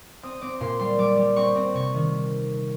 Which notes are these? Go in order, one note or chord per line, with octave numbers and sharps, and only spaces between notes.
C4 D#6
C4 D6
A#2 C6
G3 C6
G3 D6
G3
C4 C#6
C4
C3 C#6
D#3